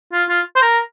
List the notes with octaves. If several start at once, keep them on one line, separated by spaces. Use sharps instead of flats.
F4
F4
C5
A#4